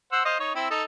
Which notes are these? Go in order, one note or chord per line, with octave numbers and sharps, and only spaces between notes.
C5 F#5 E6
C5 D#5 F5
D#4 C#5
C4 E4 G5
D#4 A4